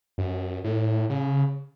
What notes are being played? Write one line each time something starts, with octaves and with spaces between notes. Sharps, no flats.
F#2
A2
C#3